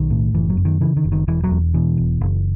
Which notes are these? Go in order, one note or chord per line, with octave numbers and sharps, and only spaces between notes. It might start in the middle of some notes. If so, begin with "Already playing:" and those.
Already playing: B1 D#3
A2
F#1 E3
F#3
F#2
D#3
C#3 E3
D#3
F#1
D#3
E1 E3
F#3
E2
B2 E3
E1
F#1